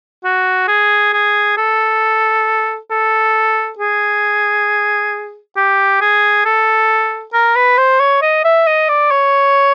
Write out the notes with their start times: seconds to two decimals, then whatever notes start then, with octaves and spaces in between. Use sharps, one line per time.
0.24 F#4
0.68 G#4
1.13 G#4
1.57 A4
2.90 A4
3.79 G#4
5.56 G4
6.01 G#4
6.45 A4
7.33 A#4
7.56 B4
7.78 C5
8.00 C#5
8.22 D#5
8.44 E5
8.67 D#5
8.89 D5
9.11 C#5